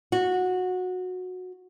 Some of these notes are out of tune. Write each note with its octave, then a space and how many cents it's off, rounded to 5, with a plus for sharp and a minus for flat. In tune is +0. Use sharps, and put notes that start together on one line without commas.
F#4 -15